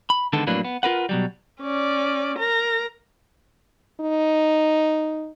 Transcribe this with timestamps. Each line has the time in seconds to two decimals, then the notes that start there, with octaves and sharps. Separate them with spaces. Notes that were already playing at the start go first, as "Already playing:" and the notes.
0.10 B5
0.33 D3 D#3 G#3 B3 A4
0.47 F2 A2 F#3 A#3 D4 B4
0.65 B3
0.83 F4 A#4 B4 F#5
1.09 B2 F#3 G3
1.61 C#4 D5
2.39 A#4 A#5
4.00 D#4